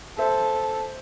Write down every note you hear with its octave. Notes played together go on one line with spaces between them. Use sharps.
A4 C5 E5